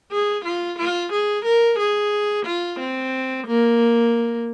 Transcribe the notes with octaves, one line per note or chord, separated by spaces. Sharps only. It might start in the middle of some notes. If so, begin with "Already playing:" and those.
G#4
F4
F4
G#4
A#4
G#4
F4
C4
A#3